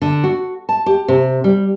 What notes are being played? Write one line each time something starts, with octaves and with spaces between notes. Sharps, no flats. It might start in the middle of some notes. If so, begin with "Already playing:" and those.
D3
F#4
A5
G4
C3
G3